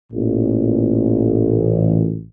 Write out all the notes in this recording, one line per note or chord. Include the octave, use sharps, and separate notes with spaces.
A1 A#2